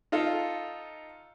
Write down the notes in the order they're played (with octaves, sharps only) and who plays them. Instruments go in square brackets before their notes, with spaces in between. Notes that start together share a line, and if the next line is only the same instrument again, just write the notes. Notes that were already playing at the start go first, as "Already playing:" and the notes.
[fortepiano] D#4 F4 A4